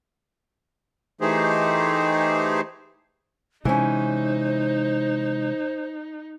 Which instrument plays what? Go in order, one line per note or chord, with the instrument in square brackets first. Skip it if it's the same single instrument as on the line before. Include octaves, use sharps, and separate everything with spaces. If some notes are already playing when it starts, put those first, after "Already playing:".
[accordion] E3 A3 D#4 G4 G#4 C5
[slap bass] C3 G#3 [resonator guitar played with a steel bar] E3 C#4 [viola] D#4 [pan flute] C5